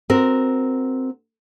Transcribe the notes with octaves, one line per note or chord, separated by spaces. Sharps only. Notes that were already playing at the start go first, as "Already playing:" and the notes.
C4 F#4 A#4